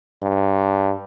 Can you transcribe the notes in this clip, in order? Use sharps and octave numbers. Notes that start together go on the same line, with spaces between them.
G2